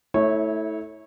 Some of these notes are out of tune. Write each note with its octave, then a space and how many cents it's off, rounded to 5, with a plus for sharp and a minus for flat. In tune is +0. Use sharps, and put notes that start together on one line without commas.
A3 +0 E4 -30 C#5 -15